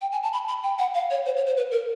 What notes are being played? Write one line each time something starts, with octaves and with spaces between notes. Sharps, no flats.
G5
G#5
A5
B5
B5
G5
F#5
F5
C#5
C5
C#5
C5
B4
A#4